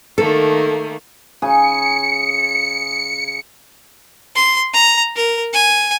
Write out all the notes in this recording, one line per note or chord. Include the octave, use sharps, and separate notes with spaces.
D#3 A3 A#3 A4
C#3 G#4 G#5 C#7
C6
A#5
A#4
G#5